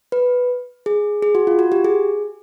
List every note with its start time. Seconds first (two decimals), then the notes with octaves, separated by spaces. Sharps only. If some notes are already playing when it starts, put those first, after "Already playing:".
0.12 B4
0.86 G#4
1.22 G#4
1.35 F#4
1.47 F4
1.59 F#4
1.72 G4
1.85 G#4